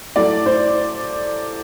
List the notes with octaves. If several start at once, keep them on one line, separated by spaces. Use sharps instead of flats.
A2 F#3 A3 D5
C5